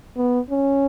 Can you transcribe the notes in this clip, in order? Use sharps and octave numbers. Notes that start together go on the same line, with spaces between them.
B3
C#4